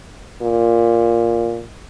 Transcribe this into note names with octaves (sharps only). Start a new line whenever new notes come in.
A#2